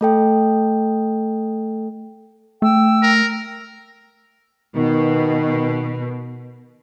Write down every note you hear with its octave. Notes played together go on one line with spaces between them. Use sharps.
A3 A4 G5
A3 G5 E6
A#4
B2 D#3